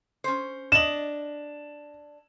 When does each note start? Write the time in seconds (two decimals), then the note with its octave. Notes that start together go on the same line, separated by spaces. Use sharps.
0.24 C#4 C5
0.72 D4 D#5 E7 F#7